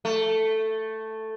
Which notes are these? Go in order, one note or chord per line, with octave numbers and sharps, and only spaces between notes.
A3